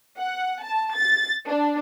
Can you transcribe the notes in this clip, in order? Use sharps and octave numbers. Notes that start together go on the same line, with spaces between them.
F#5
A5
A6
D4